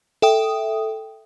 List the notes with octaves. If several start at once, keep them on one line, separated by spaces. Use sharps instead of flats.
A4 E5 G5 D#6